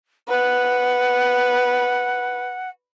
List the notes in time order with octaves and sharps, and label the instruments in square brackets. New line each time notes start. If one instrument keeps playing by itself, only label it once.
[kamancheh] B4 [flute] F#5